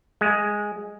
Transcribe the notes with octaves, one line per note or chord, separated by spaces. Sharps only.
G#3